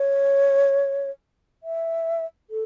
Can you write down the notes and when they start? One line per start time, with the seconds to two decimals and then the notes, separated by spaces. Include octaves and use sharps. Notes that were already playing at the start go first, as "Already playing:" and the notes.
Already playing: C#5
1.63 E5
2.50 A4